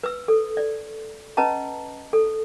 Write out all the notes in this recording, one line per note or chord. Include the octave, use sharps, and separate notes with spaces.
B4 E6
A4
D5
C#4 B4 D#5 A5 A#5
A4